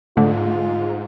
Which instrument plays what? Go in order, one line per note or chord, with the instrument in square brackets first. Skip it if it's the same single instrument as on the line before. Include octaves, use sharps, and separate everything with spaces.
[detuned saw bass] G#2 [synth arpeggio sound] D3 A3 [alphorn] F4